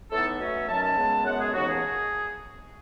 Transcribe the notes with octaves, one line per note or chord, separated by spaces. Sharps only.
A2 E3 B3 D#4 A4
E5
B2 F#3 A3 C#4
F#2 D#3 F#3 C#4 A5
A5
C#2 C#3 G#3 B3
F#2 C#3 G#3 B3 F#5
G#4
D#2 C#3 E3 B3 D#4 F#4
G#4